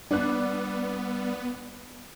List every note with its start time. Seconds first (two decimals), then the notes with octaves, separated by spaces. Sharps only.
0.11 G3 B3 D4 F#6